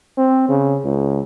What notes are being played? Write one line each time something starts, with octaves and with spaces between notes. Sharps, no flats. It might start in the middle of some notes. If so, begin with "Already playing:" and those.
C4
C#3
C#2